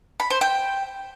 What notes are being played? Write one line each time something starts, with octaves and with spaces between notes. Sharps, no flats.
B5
C5
G5